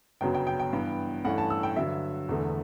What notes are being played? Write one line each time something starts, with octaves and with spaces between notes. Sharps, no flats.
G1 F#2 C#3 F#3 B3 G5
G5
G5
G5
G2 E3 B3
G2 E3 A3 C#4 F#5
A5
E6
G5
G2 D3 F#3 E5
E1 E2 D3 A3